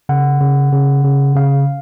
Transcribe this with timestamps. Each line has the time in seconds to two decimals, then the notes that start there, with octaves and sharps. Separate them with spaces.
0.09 C#3 F#5
0.41 C#3
0.72 C#3
1.05 C#3
1.35 C#3 F5